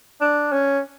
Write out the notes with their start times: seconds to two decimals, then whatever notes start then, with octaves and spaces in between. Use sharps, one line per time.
0.21 D4
0.53 C#4